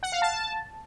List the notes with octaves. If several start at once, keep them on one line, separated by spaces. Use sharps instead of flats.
F#5
F5
A5